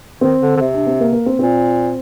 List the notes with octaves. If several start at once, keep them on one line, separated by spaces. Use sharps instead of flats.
D#3 C4
D3
D3
C3
D4
C4
A#3
A#3
C4
A#2 C4